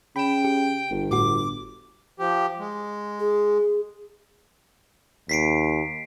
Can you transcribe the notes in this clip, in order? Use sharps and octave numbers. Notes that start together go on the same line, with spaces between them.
C#3 G5 B5 E7
G4
G1
A2 F#4 D6
F3 G4
G#3
G#4
D#2 B6 C7 D7